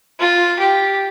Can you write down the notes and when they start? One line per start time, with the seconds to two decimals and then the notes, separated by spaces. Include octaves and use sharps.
0.20 F4
0.59 G4